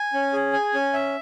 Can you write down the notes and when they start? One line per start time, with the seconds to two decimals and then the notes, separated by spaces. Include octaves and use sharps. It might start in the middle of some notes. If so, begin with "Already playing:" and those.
Already playing: G#5
0.13 C#4
0.33 G#4
0.53 G#5
0.74 C#4
0.93 E5